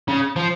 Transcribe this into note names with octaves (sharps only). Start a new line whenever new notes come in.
C#3
F3